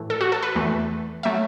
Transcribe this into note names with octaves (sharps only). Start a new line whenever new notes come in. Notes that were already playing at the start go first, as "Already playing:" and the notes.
Already playing: A2 E3 A3
A4
F#4
A4
B4
E2 E3 A3
F#3 A3 E5